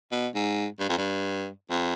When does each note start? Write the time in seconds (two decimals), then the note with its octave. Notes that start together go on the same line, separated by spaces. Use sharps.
0.12 B2
0.35 G#2
0.80 G2
0.89 F2
0.97 G2
1.70 F2